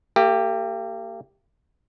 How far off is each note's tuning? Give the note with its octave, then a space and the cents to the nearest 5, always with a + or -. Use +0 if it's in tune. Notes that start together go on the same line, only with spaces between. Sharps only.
A#3 -45 G4 +0